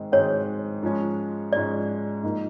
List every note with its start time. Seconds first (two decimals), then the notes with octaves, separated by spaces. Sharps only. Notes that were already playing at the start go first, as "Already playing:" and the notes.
Already playing: G#2 D#3 G#3 C4
0.12 G#2 D#3 G#3 C4 C#5
0.83 G#2 F3 G#3 C#4
1.53 G#2 F3 G#3 C#4 D5
2.23 G#2 F3 A#3 D#4